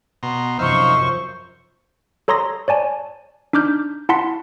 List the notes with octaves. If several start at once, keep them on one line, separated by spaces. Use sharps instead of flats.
B2 A#5 C6
F#2 C3 F3 D#4 C5 E5 F5 C#6
A4 C#5 A#5 C6 D#6 A#6
C#5 D5 G#5 A5
D4 D#4 D6 F6 G6
E4 F#5 A5 C6 B6 C#7